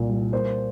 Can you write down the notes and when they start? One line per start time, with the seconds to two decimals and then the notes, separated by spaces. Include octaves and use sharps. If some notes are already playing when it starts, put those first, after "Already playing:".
Already playing: C2 A#2 A#3
0.09 G3
0.32 A#3 C5